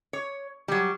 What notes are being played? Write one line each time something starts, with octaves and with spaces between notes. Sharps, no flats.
C#5
F#3 G3